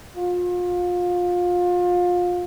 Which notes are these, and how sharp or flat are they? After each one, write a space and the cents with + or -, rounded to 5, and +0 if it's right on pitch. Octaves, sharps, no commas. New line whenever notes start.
F4 +30